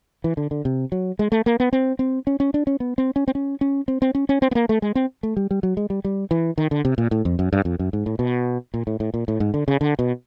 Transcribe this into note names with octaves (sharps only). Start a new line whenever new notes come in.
E3
D3
D3
C3
F#3
G#3
A3
A#3
B3
C4
C4
C#4
C#4
D4
C#4
B3
C4
C#4
C4
C#4
C#4
C4
C4
C#4
C#4
C4
B3
A#3
A3
G#3
C4
A3
G3
G3
F#3
G#3
G3
G3
E3
D#3
D3
C3
A#2
A2
F2
F#2
G2
F2
F#2
G#2
A2
B2
A#2
A2
A2
A#2
A2
G#2
D3
C#3
D3
B2